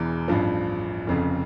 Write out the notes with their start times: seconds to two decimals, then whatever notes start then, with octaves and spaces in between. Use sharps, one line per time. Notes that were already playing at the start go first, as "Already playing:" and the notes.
Already playing: E1 E2 E3
0.28 A1 G2 F3
1.07 F1 F2 C#3